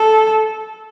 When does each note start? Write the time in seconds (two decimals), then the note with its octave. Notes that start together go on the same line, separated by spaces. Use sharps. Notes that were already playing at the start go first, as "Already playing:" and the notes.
Already playing: A4